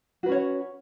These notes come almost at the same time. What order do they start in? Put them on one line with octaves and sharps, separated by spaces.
F#4 B4 C#4 C#5